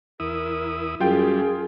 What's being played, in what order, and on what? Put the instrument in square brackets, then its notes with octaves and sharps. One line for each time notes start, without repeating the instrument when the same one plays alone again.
[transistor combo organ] E2 E4 D#6 [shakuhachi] A#4
[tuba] F#2 [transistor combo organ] G3 [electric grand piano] F4 G5 [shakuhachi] G#4